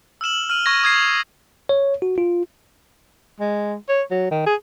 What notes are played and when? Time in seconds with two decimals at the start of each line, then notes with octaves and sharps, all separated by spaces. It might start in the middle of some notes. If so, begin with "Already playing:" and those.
0.21 E6 F6 E7 F#7
0.50 F6 D#7 F7
0.66 C#6 G#6 A#6
0.83 D#6 G#6 C7
1.69 C#5
2.02 F#4
2.18 F4
3.40 G#3
3.89 C#5
4.11 F#3
4.31 D#3
4.46 G#4